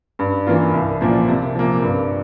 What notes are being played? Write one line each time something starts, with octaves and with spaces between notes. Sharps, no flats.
G2
E3 A#3 F4
C2
A#2 F3 A#3
C3
F3 A#3
G2